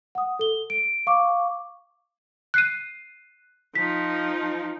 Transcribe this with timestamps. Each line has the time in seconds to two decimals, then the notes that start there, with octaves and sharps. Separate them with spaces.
0.15 F#5 D#6
0.39 A4 G7
0.70 D7
1.07 F5 C#6 D6
2.54 F#6 C7 D#7
3.75 F3 D#4 B6